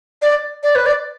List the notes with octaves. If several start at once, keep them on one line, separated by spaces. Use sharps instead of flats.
D5
D5
B4
D5